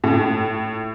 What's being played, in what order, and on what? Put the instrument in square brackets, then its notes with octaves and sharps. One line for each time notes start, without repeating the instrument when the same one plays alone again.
[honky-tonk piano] A2